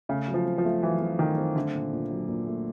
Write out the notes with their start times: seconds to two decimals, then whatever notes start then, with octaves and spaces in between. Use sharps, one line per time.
0.09 C#3 A3
0.28 F#3
0.34 F3
0.46 C4
0.58 F3
0.65 A3
0.82 E3 F#3
1.01 C4
1.19 D#3 A3
1.37 C4
1.56 D3 A3
1.74 A#2
1.93 A#2
2.11 F#3
2.28 A#2
2.47 A3